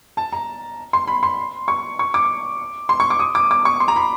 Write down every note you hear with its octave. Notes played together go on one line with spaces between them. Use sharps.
A5
A#5
C6
B5
C6
C#6
C#6
D6
C6
C#6
D6
D#6
D6
D6
C#6
C6
A#5
B5